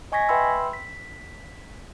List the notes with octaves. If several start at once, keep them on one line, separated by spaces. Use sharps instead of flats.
D#5 G#5 C#6 G#6 A#6 B6
B4 E5 G5 B5 C6 E6
B6